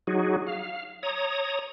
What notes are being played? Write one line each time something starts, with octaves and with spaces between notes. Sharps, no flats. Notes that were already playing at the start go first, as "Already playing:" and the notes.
F#3 D#4 F#4 G#4
F5
C#5 A#5 D#6